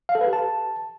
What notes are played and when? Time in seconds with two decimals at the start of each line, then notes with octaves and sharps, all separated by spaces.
0.09 F5
0.15 A4
0.21 B4
0.27 G4
0.33 A5